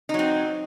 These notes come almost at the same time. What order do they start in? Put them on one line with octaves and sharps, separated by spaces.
D#4 F#3 C4